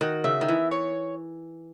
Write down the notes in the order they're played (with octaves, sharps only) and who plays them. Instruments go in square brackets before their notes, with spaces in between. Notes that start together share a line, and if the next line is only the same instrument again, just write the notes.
[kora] D#3 [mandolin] F#4
[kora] C#3 [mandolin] E5
[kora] D#3
[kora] E3 [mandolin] B3
[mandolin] C#5